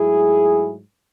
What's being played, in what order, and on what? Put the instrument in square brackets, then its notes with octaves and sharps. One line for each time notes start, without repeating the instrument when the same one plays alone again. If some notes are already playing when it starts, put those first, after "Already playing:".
Already playing: [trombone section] G#2 F#3 A3 E4 G#4